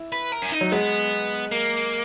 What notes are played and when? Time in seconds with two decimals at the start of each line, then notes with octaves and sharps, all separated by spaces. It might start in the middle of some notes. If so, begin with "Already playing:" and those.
Already playing: E4
0.12 B4
0.32 A#4
0.42 C#4
0.52 D#4
0.61 F#3
0.72 G#3 B3
1.52 A#3